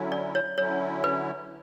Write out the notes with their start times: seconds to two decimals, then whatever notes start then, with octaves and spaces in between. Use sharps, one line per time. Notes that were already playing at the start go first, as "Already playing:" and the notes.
Already playing: D3 F#3 C#4 E4
0.12 D5
0.35 C#5
0.57 D3 F#3 C#4 E4 C#5
1.04 B4